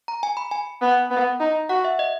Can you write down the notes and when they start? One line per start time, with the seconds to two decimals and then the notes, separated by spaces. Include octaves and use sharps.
0.08 A#5
0.23 G#5
0.37 B5
0.51 G#5
0.81 B3
1.11 B3
1.40 D#4
1.69 F#4 F#5
1.85 E5
1.99 D#5